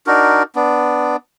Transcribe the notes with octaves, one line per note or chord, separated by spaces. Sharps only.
D4 D#4 F#4 A#4
B3 D4